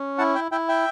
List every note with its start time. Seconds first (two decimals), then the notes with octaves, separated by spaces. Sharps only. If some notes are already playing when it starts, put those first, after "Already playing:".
Already playing: C#4
0.18 E4 F#5 A5
0.35 E5 G5
0.52 E4 E5 G5
0.69 E5 G5